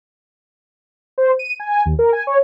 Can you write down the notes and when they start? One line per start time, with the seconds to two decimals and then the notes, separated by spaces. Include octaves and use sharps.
1.18 C5
1.39 D#7
1.60 G#5
1.86 D#2
1.99 A#4
2.13 G#5
2.27 C#5